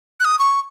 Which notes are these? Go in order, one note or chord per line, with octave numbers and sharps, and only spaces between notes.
F#6
D#6
C#6